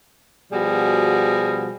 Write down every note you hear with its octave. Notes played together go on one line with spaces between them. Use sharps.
B2 F3 G3 F#4 G#4